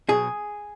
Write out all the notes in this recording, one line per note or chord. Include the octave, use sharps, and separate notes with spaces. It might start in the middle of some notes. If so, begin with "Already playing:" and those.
B2 F#3 G#4